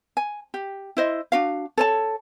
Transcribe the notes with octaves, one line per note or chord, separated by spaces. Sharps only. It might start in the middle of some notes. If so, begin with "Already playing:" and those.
G#5
G4
E4 C5 D#5
D4 F#4 F5
A4 C#5 A5